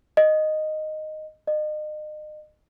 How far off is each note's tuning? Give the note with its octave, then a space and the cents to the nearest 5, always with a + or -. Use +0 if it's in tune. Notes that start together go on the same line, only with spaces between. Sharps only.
D#5 -5
D#5 -35